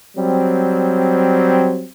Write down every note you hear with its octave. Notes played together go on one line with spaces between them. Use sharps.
F#3 G3 C4